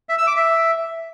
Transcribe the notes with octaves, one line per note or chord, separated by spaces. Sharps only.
E5
E6
D6
E5